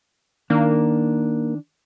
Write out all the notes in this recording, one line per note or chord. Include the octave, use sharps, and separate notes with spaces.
D#3 A#3 D4